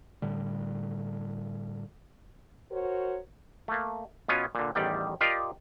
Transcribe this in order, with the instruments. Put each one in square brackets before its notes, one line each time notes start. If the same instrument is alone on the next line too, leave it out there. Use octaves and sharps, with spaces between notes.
[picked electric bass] A2 D3 G3
[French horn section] F#4 A#4 C5 C#5
[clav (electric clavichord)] A3 A#3
B2 B3 C#4 F4 G#5
A#2 D3
A1 E2 D#3 G3 D5 G5
F4 G4 A#4 D5 D#5 F5